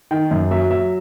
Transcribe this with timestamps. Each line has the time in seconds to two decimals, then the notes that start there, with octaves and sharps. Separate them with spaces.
0.11 D#3 G5
0.31 F#2
0.51 F#3 E5
0.70 F#3 E5